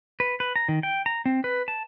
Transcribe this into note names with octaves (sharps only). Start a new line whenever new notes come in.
B4
B4
A#5
D#3
G5
A#5
C4
B4
A5